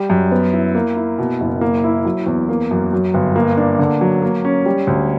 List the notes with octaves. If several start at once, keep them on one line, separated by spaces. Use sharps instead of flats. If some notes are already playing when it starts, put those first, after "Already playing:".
Already playing: G3
F#2
B3
E4
A#3
E4
B2
F#1
A#3
E4
F#3
E2
A#3
F#2
F#3
G1
A#3
D4
D3
F#3
A#3
C#4
G3
D2